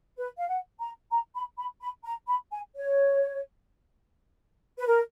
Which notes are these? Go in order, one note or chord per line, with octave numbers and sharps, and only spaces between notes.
B4
F5
F#5
A#5
A#5
B5
B5
B5
A#5
B5
G#5
C#5
B4
A#4